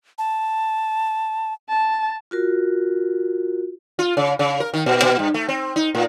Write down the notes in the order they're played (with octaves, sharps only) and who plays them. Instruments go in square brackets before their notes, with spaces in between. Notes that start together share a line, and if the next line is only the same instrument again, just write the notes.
[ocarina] A5
[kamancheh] A5
[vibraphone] F4 F#4 A#4
[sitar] F4
C#3
C#3
A#4
D#3
A#2
A#2
G2
A3
C4
D#4
A2